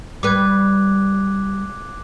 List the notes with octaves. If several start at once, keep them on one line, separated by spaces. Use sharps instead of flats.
G3 B4 D6 F#6 G#6